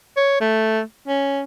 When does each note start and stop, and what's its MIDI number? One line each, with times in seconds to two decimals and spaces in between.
0.16 0.36 73
0.40 0.81 57
1.08 1.41 61